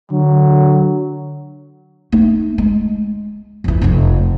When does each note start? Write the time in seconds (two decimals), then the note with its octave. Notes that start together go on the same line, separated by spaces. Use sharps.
0.11 D3 F#3
2.12 A3 D#4
2.58 G#3
3.64 F2 E3
3.82 F1 F2